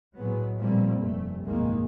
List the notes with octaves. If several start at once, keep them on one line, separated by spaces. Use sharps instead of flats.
A2 F#3 G#3 B3
A#2 F3 G3 A3 A#3 C4
F1 G2 A3
G1 F2 A#2 D#3 G#3 A#3